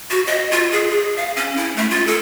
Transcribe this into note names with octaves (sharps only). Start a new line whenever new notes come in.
F#4
D#5
F4
G#4
G#4
F5
C#4
E4
A3
F4
A4